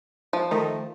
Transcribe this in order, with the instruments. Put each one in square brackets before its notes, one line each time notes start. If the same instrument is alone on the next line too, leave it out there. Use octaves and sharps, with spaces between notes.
[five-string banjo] F3
[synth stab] D#3 A3 D#4